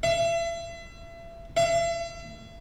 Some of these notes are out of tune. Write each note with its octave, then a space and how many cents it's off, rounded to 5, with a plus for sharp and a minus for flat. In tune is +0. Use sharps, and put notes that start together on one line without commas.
E5 +35
E5 +40